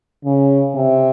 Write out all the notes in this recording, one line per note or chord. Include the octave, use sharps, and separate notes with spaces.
C#3
C3